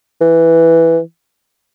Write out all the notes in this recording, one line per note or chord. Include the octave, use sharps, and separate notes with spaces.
E3